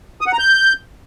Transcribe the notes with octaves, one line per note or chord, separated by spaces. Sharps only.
D#6
F#5
A#5
G6